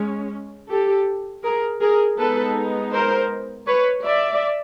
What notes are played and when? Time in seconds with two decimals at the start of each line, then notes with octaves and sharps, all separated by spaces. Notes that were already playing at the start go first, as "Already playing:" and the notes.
Already playing: G#3 C#4
0.70 G4 A4
1.44 G#4 A#4
1.81 G#4 A#4
2.18 G#3 B3 D#4 A4 B4
2.92 A#4 C5
3.66 B4 C#5
4.04 D5 E5